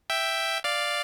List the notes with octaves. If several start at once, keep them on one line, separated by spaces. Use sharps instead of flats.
E5 G5
D5 F5